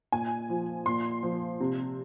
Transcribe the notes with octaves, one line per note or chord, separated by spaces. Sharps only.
A#2 G#5
F3
A#2 C6
F3
C3